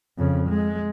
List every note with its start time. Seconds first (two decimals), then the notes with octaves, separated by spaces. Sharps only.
0.18 F2 C#3
0.49 G#3